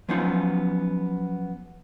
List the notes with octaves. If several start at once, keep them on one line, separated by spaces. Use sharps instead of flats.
F3 F#3 B3 C#4 D#4 F4